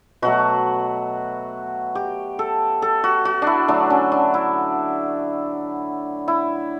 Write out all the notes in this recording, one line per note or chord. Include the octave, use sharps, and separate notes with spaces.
B2 F#3 A3 F#4
G4
A4
A4
F#4
F#4
D4 E4
D3 F#3 A3 D4
C#4
D4
E4
E4